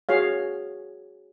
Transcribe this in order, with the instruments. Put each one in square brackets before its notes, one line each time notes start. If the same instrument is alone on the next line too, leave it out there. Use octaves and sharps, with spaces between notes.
[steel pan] F#4 G#4 C#5 F5